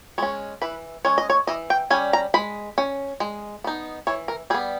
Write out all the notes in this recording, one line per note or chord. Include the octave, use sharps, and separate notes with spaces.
G#3 C#4 C#5
E3 B4
G#3 C#4 C#5
D#5
C#5
E3 D#5
G5
G3 C#4 G#5
A#5
G#3 B5
C#4
G#3
B3 D#4
E3 C#5
A#4
G3 B3 G#4